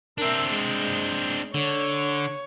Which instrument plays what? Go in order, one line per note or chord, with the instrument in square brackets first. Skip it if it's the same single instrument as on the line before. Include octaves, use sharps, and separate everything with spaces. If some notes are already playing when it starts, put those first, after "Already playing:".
[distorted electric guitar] C4 D4 [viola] A#4 E5
[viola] G#3
[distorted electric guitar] D3 [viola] C#5